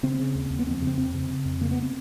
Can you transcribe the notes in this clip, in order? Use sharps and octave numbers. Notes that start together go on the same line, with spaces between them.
C#3 C4
C#3
D#2
D#2
B3
F2 C4
C#3 C4
F2 C4
C#3
C#3
F2
C#3 A#3
B3
C4